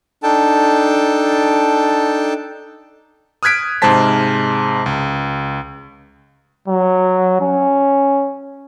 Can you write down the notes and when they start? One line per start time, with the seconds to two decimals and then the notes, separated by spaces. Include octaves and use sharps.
0.23 D4 D#4 A4 G5 A5
3.43 D#6 F6 F#6 G#6 B6 D7
3.82 G#2 C3 G#3 C5 A5 B6
4.86 C#2
6.68 F#3
7.41 C#4